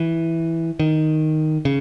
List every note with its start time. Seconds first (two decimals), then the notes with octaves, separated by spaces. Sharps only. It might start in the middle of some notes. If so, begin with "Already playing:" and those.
Already playing: E3
0.80 D#3
1.65 C#3